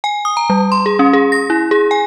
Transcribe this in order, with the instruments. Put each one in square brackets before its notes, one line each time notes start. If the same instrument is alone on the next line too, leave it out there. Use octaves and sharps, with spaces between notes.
[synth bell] G#5
D#6
A#5
G3
C6
G#4
C#4
G#4
A#6
E4
G#4
G#5